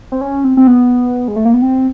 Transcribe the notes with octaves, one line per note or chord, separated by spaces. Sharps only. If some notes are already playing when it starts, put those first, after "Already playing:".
C4
C#4
C4
C4
B3
G#3
A3
A#3
B3
C4